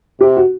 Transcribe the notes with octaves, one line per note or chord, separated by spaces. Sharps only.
C3 G4
F#4